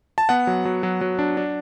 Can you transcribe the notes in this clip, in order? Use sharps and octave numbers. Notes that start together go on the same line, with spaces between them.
A5
B3 F#5
F#3
F#3
F#3
F#3
D4
D4